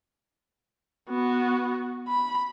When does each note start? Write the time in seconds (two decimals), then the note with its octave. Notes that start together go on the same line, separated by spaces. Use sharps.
1.09 B3 F#4
2.09 B5